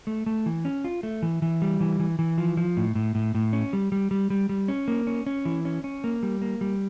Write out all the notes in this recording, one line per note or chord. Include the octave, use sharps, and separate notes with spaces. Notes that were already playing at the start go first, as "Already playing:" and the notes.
A3
A3
E3
C#4
F4
A3
E3
E3
G3
E3
E3
E3
F3
F3
A2
A2
A2
A2
C#4
G3
G3
G3
G3
G3
C#4
A#3
C#4
C#4
E3
C#4
C#4
A#3
G3
A#3
G3